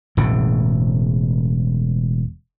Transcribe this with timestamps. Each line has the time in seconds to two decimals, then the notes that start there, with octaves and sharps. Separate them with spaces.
0.17 E1 A2 C#3